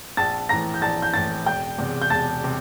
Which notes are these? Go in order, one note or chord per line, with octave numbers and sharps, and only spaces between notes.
A#1 A5 A6
A2 E3 A#5 A#6
G6
A#1 A5 A6
G6
A2 E3 A5 A6
E1 G5 G6
E2 C3
G6
E1 A5 A6
C3